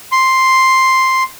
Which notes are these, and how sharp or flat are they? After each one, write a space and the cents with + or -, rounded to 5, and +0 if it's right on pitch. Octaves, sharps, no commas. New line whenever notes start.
C6 +5